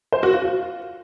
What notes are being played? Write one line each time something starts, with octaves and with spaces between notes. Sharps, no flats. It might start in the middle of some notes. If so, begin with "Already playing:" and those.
C5
F#4
F4
F4